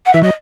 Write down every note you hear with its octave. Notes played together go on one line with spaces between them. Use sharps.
F#5
E3 E5
F#3 D#5